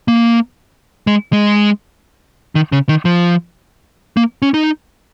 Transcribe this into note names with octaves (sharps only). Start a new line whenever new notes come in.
A#3
G#3
G#3
D#3
C#3
D#3
F3
A#3
C#4
D#4